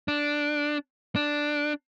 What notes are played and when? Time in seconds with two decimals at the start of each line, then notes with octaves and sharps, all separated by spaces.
0.08 D4
1.16 D4